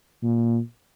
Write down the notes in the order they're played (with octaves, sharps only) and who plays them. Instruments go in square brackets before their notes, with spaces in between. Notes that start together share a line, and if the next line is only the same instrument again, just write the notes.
[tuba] A#2